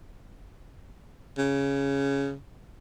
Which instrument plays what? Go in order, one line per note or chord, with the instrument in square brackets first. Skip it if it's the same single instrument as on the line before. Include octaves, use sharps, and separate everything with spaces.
[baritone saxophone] C#3